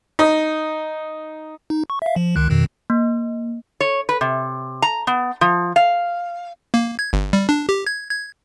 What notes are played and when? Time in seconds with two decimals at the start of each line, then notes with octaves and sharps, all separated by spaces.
0.19 D#4
1.70 D#4
1.90 C#6
2.02 E5 F5
2.16 F3
2.36 C#2 D#3 F#6
2.51 F2 B2 D#3
2.90 A#3
3.80 C#5
4.09 B4
4.21 C3
4.82 A#5
5.07 B3
5.41 F3
5.76 F5
6.74 A#3
6.99 G#6
7.13 G1
7.33 G3
7.49 D4
7.69 G4
7.87 G#6
8.10 G#6